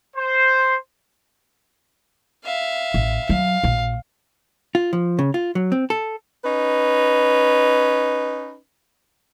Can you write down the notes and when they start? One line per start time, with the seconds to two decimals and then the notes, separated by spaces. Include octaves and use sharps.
0.16 C5
2.43 E5 F5
2.94 A1
3.29 F#3 F5
3.64 A#1
4.75 F4
4.93 F3
5.19 C#3
5.34 F4
5.55 F#3
5.72 C4
5.90 A4
6.44 C#4 D#4 B4